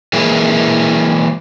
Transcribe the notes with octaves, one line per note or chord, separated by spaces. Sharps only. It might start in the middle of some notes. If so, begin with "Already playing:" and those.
E3 G#3 A#3 E4